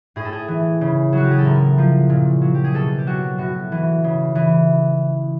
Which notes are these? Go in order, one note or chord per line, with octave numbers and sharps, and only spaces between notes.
A2 G#4
A4
G#4
E3
C#3
F#3 F#4
G4
G#4
A4
A2 A#4
F3
A#2
F#3
G4
G#4
B2 A4
G4
F#3 F#4
A2 F#4
E3
C#3
E3